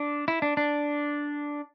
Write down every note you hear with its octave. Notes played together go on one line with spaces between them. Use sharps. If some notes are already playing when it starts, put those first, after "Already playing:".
Already playing: D4
E4
D4
D4